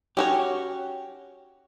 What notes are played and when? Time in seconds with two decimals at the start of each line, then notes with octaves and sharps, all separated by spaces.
0.17 C#4 F#4 G4 C#5